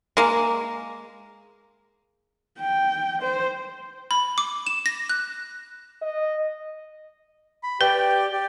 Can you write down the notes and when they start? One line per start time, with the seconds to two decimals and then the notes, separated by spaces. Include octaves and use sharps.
0.17 G#3 A#3
2.60 G5
3.22 C5
4.11 B5
4.38 D6
4.67 E7
4.86 A#6
5.09 F#6
6.02 D#5
7.63 B5
7.81 G4 B4 D5 G5
8.32 G4 D5